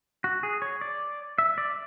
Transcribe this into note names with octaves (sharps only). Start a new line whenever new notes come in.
F#4
G#4
C#5
D5
E5
D5